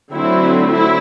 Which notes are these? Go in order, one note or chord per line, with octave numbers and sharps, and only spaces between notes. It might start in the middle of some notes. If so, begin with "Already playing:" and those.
D3 F#3 A3 C4 E4
E4